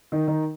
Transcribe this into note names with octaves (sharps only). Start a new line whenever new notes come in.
D#3 D#4
D#3 D#4